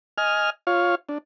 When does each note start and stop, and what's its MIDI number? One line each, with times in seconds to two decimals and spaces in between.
0.18 0.50 75
0.18 0.50 80
0.18 0.50 89
0.67 0.95 65
0.67 0.95 73
0.67 0.95 77
1.09 1.18 62